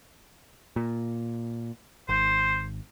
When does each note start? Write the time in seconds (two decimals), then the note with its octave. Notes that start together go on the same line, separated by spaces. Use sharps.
0.76 A#2
2.09 G#1 C5